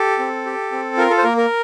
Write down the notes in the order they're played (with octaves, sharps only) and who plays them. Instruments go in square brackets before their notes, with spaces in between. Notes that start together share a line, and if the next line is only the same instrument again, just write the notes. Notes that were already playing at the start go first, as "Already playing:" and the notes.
Already playing: [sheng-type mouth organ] G4 A4
C4
G4
C4
F4 A#4
A4
C5
A#3 A#4
A#4